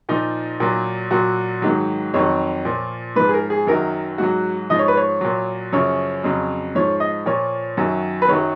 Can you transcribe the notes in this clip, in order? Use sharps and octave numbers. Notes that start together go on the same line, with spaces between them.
A#2 F3 D#4
A#2 F#3
A#2 F#3 F#4
G#2 D#3 F#3
F2 D#3 F#3 C#5
A#2 F3
G#2 F3 B4
G#4
A#4
G#4
F#2 D#3 F#3 A#4
G#2 F#3 F#4
G#2 F3 D#5
C#5
B4
C#5
A#2 F#3
F#2 C#3 F3 C#5
F2 C#3 F#3
G#2 F3 C#5
D#5
A#2 F3 C#5
F#2 D#3 F#3
B4
F#2 D#3 F#3 C#5